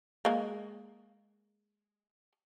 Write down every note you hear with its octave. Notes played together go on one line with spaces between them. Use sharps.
G#3 A#3